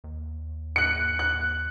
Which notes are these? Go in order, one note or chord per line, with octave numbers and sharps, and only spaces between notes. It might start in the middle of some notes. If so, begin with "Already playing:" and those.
D#2
F#6 C#7
F#6